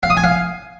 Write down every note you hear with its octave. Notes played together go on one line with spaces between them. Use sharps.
F5
D#6
G#5
F5